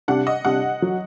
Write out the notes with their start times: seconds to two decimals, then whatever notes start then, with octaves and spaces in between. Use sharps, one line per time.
0.08 C3 G3 D4 G4 F#5
0.27 D#5
0.45 C3 G3 D4 G4 F#5
0.82 F#3